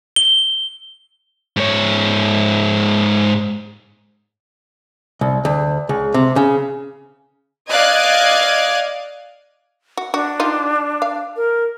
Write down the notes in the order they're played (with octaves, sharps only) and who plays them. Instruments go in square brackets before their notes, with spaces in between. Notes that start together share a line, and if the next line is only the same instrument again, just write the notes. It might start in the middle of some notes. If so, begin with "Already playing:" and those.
[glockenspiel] G7
[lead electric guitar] G#2 C#5
[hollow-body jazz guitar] C2
D2
C#2
C3
C#3
[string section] D5 D#5 F5 F#6 G#6
[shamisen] F#4
[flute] D4 [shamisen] F#4
[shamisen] D#4 F4 G4
F5
[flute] A#4